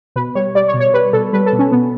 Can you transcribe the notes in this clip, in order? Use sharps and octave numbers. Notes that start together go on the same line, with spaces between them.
B2 B4
G3 C#5
G3 D5
C#5
B2
C#5
G3 B4
B2 A4
G3 B4
A4
B2
C#4
B2 B3